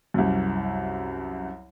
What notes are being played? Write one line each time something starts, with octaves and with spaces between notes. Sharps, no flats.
C2 F#2